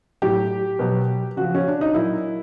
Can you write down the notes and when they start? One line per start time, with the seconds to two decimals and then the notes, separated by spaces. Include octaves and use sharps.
0.22 A2 F#3 G4
0.79 B2 F#3
1.37 C#3 F3 F#4
1.55 C#4
1.68 D4
1.81 D#4
1.94 A#2 F#3 E4